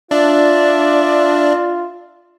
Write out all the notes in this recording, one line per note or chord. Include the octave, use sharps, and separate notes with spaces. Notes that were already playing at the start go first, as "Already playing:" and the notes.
D4 F4 D5 E5